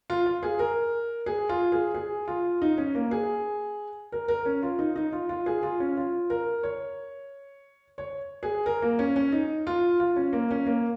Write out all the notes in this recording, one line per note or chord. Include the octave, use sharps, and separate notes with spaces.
F4
F4
G#4
A#4
G#4
F4
G#4
G#4
F4
D#4
C#4
A#3
G#4
A#4
A#4
C#4
F4
D#4
D#4
F4
F4
G#4
F4
C#4
F4
A#4
C#5
C#5
G#4
A#4
A#3
C#4
C#4
D#4
F4
F4
C#4
A#3
C#4
A#3